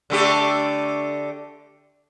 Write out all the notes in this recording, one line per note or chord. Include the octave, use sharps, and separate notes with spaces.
D3 A3 G4